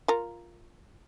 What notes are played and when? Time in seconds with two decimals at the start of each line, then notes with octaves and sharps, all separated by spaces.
0.08 F4 A#4